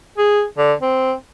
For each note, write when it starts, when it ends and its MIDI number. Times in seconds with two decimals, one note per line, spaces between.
0.18 0.43 68
0.58 0.73 50
0.82 1.13 60